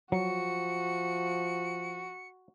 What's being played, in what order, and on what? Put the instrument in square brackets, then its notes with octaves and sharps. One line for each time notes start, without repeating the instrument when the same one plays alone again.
[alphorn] F3 [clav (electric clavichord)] F#3 [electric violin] F#4 [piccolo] C#7